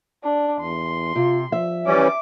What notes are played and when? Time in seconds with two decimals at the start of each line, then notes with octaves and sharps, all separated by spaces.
0.24 D4 D5
0.60 E2 C6
1.16 C3 F4
1.52 F3 E5
1.86 E3 G3 C#4 D6